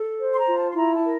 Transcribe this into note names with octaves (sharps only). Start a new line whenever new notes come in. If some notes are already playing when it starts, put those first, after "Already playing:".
Already playing: A4
C5
C6
A#5
F4
A5
C6
E4 A#5
A5
A#4